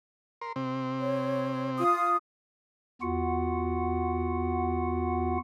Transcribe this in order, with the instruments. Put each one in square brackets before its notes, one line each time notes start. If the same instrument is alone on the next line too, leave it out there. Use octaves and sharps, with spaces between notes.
[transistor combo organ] A#4 C6
C3 C4
[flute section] C#5
F4 D#6
[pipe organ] E2 B3 F4 F#4 F#5